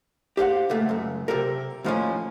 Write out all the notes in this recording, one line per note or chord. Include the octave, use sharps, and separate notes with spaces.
G4 C5 F5 F#5
C#2 A#2 A3
C#2 F#2
C3 G4 A4 A#4
D#2 A2 F3 G#3 A#3 C#4